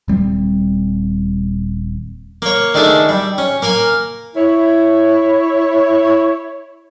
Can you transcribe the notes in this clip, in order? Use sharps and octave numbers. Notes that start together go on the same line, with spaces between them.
D#1 G3 C4
A#3 C#5
D#3 A3 D4 G#4 A4
G3
C#4
A#3 A#4 G#5
E4 C#5